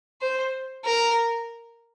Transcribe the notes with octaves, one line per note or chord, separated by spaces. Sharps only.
C5
A#4